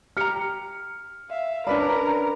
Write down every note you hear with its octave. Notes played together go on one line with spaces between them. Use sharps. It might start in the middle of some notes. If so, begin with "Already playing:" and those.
G4 A#5 F6 C#7
E5 F5
C#4 D4 A#4 B4 D5 B5